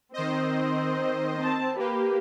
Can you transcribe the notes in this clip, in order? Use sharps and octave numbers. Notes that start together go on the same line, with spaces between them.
D#3 C4 C5 D#5
C4 A5
A#3 G4 B4